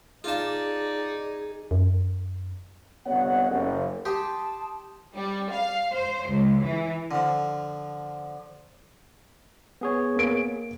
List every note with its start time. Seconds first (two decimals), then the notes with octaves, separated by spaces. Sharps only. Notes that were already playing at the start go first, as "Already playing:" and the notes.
0.24 D#4 F4 G#4 D5 A5
1.71 F#2
3.06 G1 C3 B3 C#5 D#5 F#5
3.50 F#1
4.05 G4 A5 C6 D#6
5.15 G3
5.51 F5
5.93 C5
6.29 C#2
6.65 E3
7.11 D3 F3
9.81 B3 G#4 C#5
10.16 A#3 D7